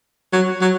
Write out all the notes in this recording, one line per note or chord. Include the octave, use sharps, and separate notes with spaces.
F#3
F#3